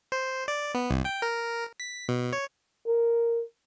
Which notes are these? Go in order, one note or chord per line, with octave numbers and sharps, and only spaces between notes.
C5
D5
B3
C2
G5
A#4
B6
B2
C#5
A#4